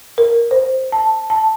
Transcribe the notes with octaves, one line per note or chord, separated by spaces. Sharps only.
A#4
C5
A5
A5